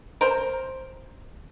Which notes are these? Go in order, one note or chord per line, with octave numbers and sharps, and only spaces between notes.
A#4 C5